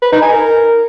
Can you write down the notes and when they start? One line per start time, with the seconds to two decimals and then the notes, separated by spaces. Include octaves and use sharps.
0.02 B4
0.12 D#4
0.22 G#5
0.32 A#4